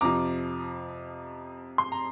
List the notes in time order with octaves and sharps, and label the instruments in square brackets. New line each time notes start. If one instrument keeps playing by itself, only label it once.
[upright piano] F2 C3 F3 A#5 D6
C6
A#5